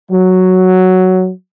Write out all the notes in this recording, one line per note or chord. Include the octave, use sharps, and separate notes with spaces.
F#3